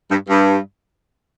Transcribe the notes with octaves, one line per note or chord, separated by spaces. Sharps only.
G2
G2